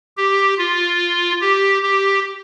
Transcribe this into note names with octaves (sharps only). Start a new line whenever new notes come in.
G4
F4
G4
G4